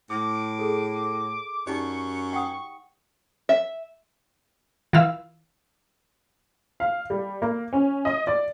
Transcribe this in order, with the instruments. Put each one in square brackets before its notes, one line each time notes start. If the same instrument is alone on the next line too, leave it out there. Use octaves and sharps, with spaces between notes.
[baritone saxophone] A2 [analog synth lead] D6
[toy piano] G#4 A4
[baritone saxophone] F#2 [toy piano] D#4 G4 D5 [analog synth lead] C#6
[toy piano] F#5 G5 D#6
[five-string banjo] E5
[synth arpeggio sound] E3 E4 F4 F5 E6
[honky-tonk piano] F5
G3
A#3
C#4
D#5
D5